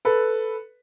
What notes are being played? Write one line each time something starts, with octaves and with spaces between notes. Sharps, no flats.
A4 B4